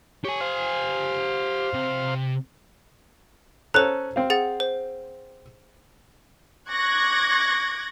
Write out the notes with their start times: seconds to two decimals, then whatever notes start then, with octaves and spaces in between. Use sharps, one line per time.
0.25 G4 C#5 G#5
0.41 C5 F5
1.74 C3
3.74 C#4 A4 C5 A#5 F#6
4.16 C4 F5
4.30 G#4 F#5 A6
4.60 C5
6.69 C#6 D6 F#6 G#6 A#6